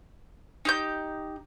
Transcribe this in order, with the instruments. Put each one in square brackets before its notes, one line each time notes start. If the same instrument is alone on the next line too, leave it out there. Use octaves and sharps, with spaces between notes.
[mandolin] D#4 G4 G6